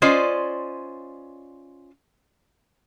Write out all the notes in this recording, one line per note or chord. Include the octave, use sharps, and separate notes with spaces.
C#4 F4 C5 D5 D#5